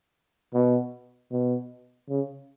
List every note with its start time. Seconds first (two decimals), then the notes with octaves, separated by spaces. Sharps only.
0.54 B2
1.32 B2
2.09 C#3